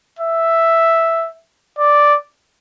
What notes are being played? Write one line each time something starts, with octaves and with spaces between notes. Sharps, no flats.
E5
D5